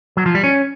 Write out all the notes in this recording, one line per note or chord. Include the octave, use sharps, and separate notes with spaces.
F#3
F3
G3
C#4